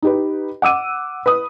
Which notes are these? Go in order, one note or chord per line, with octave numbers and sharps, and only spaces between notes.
D#4 G4 B4
F#5 D6 E6 D#7
B4 D#6